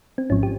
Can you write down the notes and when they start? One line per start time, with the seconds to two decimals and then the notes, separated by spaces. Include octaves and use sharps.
0.18 C4
0.30 G#1 G#2 F3 C#4
0.43 G4